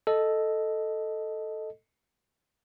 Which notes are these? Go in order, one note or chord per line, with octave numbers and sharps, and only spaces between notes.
A4 D#5